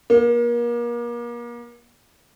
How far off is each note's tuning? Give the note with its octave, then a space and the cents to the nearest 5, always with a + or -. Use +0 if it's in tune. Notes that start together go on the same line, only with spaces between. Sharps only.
A#3 +35